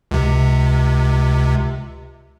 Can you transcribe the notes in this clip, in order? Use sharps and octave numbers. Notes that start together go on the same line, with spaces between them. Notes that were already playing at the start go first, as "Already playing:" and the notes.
C#2 C3